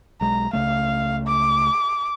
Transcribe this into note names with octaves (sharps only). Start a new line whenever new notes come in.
B1 G#3 A#5
C#2 C#3 A3 F5
D6